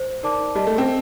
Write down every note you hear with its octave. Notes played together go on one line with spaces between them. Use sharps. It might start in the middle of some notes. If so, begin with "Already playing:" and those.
Already playing: C5
D#4 A#4 D5 A5 D6
G3 A#4 D#5 A5
A3
C4